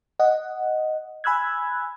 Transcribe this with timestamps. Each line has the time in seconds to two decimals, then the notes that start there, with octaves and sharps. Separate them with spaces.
0.20 D#5 F#5
1.24 G#5 B5 E6 F#6 G#6